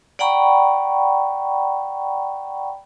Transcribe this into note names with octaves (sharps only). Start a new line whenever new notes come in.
D5 F#5 G5 A#5 B5 C#6